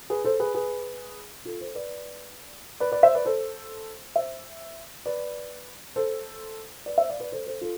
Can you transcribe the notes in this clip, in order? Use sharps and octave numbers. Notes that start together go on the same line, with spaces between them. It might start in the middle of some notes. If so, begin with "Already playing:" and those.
G#4 B4
A4 C5
G#4 B4
G#4 B4
F4 A4
A4 C5
B4 D5
B4 D5
B4 D5
C5 E5
B4 D5
A4 C5
C5 E5
B4 D5
A4 C5
B4 D5
C5 E5
D5 F5
B4 D5
A4 C5
A4 C5
F4 A4